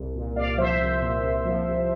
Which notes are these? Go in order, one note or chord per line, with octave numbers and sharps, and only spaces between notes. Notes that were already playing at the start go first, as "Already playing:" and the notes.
Already playing: C2
A#2
C2 D5 F5
F3 C5 E5
C2
A#2
C2
F3
C2